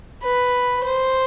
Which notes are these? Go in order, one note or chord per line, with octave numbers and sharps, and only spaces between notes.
B4
C5